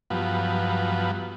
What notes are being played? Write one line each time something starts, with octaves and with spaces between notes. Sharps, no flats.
G2 F3 F#3 B3